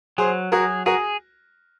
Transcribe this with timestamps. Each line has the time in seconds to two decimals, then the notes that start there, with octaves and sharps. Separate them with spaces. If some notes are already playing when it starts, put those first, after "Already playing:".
0.18 F#3 G#4 C5
0.52 F#4 G#4 A#4
0.86 F#4 G#4 A#4